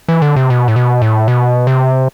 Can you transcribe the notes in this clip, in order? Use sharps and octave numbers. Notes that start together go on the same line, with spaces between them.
E3
D3
C3
B2
A2
B2
A2
B2
C3